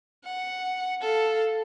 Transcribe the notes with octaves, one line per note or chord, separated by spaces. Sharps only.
F#5
A4 F5